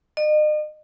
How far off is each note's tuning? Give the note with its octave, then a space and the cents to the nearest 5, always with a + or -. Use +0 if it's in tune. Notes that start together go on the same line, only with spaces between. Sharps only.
D#5 -40